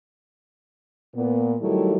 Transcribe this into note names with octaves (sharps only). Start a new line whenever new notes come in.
A#2 B3
D#3 F#3 G3 A3 E4 A#4